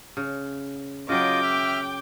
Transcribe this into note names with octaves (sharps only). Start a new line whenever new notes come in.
C#3
C#3 F#3 F4 D#5 G5 D6
E5 F6